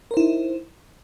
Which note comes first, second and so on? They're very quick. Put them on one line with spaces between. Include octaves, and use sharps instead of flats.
A#4 C5 E4 D#4